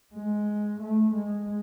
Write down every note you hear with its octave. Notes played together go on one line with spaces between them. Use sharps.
G#3
A3
G#3